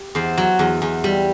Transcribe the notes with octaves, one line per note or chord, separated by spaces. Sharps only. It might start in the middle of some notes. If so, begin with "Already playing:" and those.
Already playing: G4
E2 C5
F#3
E2
E2
G3